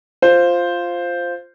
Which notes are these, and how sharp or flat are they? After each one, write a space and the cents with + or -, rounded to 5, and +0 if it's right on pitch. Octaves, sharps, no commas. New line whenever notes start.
F4 +0 C5 +0